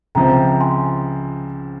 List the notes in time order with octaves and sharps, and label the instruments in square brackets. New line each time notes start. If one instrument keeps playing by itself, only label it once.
[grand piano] C#2 C3 F3 C4 [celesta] G5 A#5
[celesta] G#5 C6